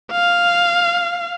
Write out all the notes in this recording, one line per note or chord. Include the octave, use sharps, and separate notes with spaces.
F5